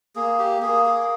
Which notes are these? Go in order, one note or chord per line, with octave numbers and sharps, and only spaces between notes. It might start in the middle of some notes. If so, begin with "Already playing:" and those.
A#3 G#4
G4
A#3 G#4
G#4